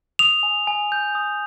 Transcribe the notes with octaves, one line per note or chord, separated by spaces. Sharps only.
D#6 F7
G#5
G#5
G6
D#6